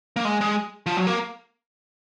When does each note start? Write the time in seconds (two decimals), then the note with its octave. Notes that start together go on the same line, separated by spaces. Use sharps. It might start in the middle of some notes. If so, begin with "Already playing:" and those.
0.16 A#3
0.25 G#3
0.41 G#3
0.86 F3
0.97 F#3
1.07 A#3